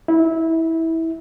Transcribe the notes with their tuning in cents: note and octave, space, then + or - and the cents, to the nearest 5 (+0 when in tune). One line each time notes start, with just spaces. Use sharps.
E4 -20